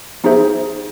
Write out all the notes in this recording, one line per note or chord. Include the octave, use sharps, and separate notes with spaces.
B3 D#4 G4 G#4 C5 E5